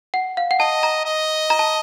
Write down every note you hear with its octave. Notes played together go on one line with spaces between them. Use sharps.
F#5
F5
F#5
D#5 A5
A#5
D#5
A#5
A5